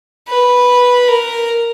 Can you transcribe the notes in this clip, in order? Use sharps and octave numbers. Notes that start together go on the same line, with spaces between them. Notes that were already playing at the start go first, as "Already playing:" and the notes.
B4
A#4